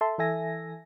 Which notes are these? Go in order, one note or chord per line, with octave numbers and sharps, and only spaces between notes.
A4 E5 A5 C6
E3 A4 E5 G#5 A#6